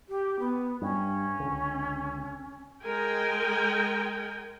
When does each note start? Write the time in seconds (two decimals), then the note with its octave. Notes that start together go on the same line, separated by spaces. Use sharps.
0.09 G4
0.39 B3
0.82 G2 C#4
1.40 C#2 D3
2.84 G#3 A#4 G5 G#5